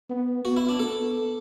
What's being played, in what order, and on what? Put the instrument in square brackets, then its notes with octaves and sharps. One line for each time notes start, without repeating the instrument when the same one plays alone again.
[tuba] B3
[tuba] B3 [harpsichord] F#4
[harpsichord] E4
D4
[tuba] B3 [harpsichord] A4